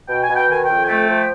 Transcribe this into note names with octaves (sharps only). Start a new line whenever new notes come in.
B2 G5
G#5
B2
G5
D#3 G#5
F2 G5
G#5
A3 G5
F3